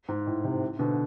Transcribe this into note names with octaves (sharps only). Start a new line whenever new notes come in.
G#2
A2
A2 C3
B2 D3